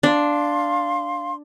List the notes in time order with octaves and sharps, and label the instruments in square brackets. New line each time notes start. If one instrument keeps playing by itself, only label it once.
[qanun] D4 [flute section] F5 C6